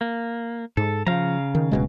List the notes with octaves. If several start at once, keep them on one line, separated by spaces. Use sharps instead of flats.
A#3
G#2 A4
C#3 F3 F5 A#5
D#3
D1 B2 G#3